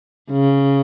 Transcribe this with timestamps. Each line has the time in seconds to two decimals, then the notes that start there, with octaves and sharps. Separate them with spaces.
0.31 C#3